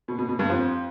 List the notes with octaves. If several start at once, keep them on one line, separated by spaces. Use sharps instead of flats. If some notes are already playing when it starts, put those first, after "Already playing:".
B2
B2
B2
G2
F2